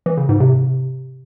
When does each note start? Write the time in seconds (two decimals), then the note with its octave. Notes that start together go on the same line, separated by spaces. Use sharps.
0.06 E3
0.17 C#3
0.29 G#2
0.40 C3